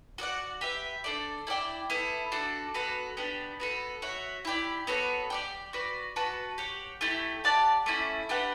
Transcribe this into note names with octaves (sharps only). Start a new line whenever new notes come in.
F#4 A4 D5 F#5
G4 B4 E5
D4 A4 D5
E4 A4 D5 G5
B3 E4 A4
D4 F#4 A4
B3 F#4 A4
B3 D4 G4
B3 F#4 A4
F#4 C#5 E5
E4 G4 D5
B3 F#4 A4 C#5
G4 D5 G5
F#4 B4 D5
F#4 B4 F#5 A5
G4 C#5 F#5
A3 E4 G4
G4 D5 F#5 A5
A3 C#4 E4
D4 G4 B4 F#5